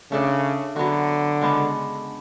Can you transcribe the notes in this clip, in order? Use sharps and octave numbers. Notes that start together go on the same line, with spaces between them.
C#3 A3 D4 A4
D3 F#3 B3 F#4
C#3 G#3 B3 D4